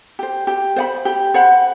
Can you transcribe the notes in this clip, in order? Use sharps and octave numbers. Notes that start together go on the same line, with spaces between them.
G4 C5
G4
C5 F#5 B5
G4
C5 F#5 B5